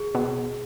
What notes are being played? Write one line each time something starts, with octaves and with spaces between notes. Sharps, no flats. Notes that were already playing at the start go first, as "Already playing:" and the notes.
Already playing: G#4
B2